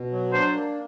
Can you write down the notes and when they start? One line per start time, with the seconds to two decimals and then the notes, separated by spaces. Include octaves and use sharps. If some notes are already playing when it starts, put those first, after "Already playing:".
Already playing: B2
0.12 F#3
0.33 D4 C5
0.54 A#3